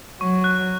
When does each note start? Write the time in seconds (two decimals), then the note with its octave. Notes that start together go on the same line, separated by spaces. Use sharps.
0.20 F#3 C#6
0.44 F#6